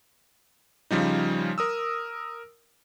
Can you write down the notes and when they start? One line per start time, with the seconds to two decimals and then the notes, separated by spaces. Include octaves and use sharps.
0.91 C#3 F3 G3 D#4
1.58 A#4 D#6 E6